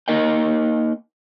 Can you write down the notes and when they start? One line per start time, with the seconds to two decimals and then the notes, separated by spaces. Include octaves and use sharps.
0.08 A#3 D#4 A#4 D#5 F5 G5